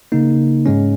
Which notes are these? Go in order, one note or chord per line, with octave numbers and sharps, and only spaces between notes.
C#3 A#3 D#4
G#2 G#3 C#4